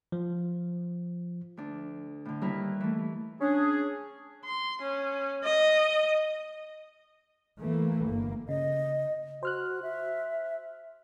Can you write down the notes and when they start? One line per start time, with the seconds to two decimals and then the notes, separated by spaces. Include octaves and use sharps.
0.12 F3
1.57 D2 D4
2.25 A2 D3
2.41 D#2 G3 E4 A#4 B4
2.80 E3 A3
3.41 C#4 D4 G#4
4.45 C6
4.82 C#4
5.44 D#5
7.59 E3 A3 A#3
8.06 G1 A#3
8.49 C#3 D#5
9.43 F#4 C5 F6 F#6
9.83 E5